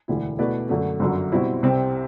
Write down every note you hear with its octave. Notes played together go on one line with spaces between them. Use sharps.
E1 D2 D3 A3 E4
B2 A3 E4 B4 D5
F#2 D3 F#3 A3
G1 F#2 D3 F#3
B2 G3 C4 E4
C2 C3 G3 C4